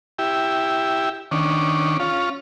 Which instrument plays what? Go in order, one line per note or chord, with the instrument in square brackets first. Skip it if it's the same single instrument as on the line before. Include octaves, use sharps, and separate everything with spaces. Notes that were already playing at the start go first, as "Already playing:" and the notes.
[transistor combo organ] E4 G4
D#3 C#4 D4
C#4 F4